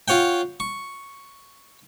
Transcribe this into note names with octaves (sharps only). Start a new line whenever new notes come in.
F4 C#5 F#5 G5
C#6